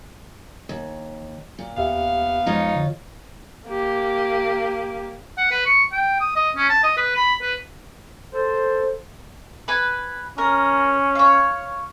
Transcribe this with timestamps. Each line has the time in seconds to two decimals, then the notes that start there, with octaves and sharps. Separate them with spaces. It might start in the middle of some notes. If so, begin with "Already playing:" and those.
0.69 D#2
1.59 A#2
1.77 D#2 B3 G4 E5 F5
2.46 F2 G#3 D#4 F4 C#5
2.75 D3
3.67 A#3 G4
5.38 F#5
5.51 B4
5.66 C#6
5.92 G5
6.20 D#6
6.36 D#5
6.56 C#4
6.70 A5
6.83 D#5
6.97 B4
7.16 B5
7.42 B4
8.34 A4 C5
9.68 B4 G#5
10.38 C#4 A#4
11.15 C#5 F5